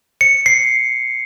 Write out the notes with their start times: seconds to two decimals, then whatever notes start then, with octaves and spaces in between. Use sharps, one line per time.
0.21 C#7
0.46 C7